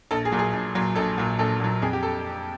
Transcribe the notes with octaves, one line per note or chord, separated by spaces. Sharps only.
A#1 A4
G#4
A#2 F#3
G#4
A#1
A#2 F#3
A#1 A4
A#2 F#3
A#1 A4
A#2 F#3
F2 G#4
G4
A4